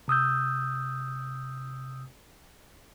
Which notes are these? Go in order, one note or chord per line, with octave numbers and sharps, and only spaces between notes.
C3 D#6 E6 G6